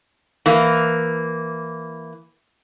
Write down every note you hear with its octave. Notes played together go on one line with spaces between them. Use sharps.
E3 A#3